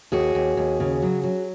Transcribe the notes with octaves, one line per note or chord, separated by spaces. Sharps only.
D#2 F#4 G#4
D#2
D#2
C#3
F#3
F#3